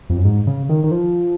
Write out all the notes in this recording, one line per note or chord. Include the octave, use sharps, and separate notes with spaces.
F2
F#2
G#2
C#3
D#3
D#3
F3